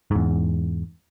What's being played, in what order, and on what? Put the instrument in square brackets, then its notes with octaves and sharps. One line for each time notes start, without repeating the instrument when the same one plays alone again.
[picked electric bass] E2 G#2